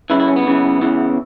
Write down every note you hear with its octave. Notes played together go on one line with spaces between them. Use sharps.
F#2 C#3 E3 E4
E4
C#4
B3
F#2 C#3 E3
E2 C#3 E3